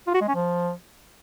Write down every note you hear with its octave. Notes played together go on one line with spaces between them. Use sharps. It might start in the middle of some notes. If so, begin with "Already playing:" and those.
F4
F#4
G#3
C#4
F3